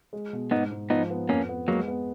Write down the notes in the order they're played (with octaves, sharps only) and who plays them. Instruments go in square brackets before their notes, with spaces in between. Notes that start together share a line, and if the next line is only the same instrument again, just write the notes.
[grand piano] G#3
B2
[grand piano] G#2 [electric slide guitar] B3 D#4
[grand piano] G#2
[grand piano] F3 [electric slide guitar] B3 D#4
[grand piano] B3
[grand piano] F2 [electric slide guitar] A#3 C#4
[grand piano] B3
[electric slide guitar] F#3 A#3 [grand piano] G#3
[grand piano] B3